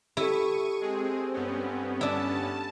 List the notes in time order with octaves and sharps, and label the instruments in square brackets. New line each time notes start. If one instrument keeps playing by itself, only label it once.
[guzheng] E4 [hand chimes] G4 A4 [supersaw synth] C#6 D#7
[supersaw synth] G#3 G#4 [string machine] C4
[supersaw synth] G2 B3 C#4
[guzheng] D4 E4 [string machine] A5